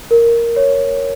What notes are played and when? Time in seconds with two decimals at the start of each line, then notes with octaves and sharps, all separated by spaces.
0.11 A#4
0.56 C#5